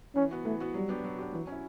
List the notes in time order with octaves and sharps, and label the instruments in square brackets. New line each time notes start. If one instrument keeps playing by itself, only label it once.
[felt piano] E3 [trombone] C#4
[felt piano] B3 F#4
[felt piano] E3 [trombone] A3
[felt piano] B3 F#4
[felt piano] F#3 [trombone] G3
[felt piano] B3 D4 G4
F#3
B3 D4 G4
[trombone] E3 [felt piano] F#3
[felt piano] C#4 E4